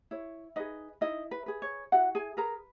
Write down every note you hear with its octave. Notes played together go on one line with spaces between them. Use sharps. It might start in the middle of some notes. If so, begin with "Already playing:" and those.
E4 C#5
D#4 G#4 B4 D#5
D#4 E4 D#5
B4
G#4 B4
C#5
E4 F#4 F#5
G#4 G#5
G#4 A#4 B4 A#5